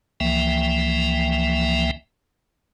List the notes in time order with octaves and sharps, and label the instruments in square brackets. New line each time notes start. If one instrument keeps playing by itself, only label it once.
[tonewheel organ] C#2 E3 F3 A#3 E5 G5